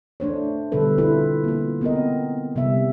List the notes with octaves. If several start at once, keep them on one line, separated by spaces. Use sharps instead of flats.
A3 D4 C5 C#5
B2 D3 G3 A4 B4
C4 E4 F4 A4 B4
A#3 F4
B3 C4 A#4 D#5
C3 G3 B3 E5